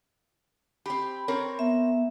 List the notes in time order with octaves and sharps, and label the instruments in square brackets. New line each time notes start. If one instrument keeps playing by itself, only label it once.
[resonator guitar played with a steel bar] C4 G4 [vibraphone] B5
[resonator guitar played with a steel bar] C4 A#4 C#5
[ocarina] B3 [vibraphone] E5